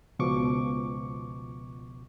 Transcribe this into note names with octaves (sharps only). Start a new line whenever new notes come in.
C#2 B2 F3 C#6 D6